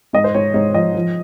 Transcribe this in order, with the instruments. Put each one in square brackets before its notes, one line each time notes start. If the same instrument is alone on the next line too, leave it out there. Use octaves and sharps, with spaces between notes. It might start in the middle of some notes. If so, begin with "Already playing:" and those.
[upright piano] G#2 D#5
C5
G#2 C#5
G#2 C#5
F3 D#5
F3